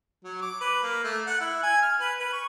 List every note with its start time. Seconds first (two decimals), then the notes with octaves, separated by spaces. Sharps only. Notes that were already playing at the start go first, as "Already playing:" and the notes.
0.24 F#3
0.42 D6
0.60 B4
0.83 A#3
1.04 A3
1.26 F#5
1.40 E4
1.63 G#5
1.82 F6
2.00 B4
2.20 B4
2.33 C#6